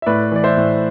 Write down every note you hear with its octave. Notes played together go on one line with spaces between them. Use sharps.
E5
A2 B4 D5
E3 D5
C5 E5
A2